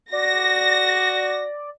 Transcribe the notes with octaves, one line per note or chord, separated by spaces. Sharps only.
F#4 D5 A#6